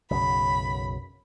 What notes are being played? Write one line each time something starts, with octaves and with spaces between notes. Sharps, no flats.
B1 F#2 C#3 B5